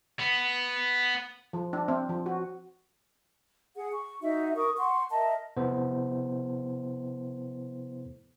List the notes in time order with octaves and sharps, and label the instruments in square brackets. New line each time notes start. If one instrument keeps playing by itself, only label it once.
[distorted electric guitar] B3
[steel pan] F3
D4
C4
F3
F#4
[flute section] G#4 F#5
C#6
D#4 F#4 E5
A#4 C#6 D#6
F#5 C6 C#6
A#4 D#5 E5 A5
[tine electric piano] C3 F3 B3 E4 A4 C5